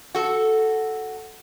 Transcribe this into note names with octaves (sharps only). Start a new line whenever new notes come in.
F#4 A4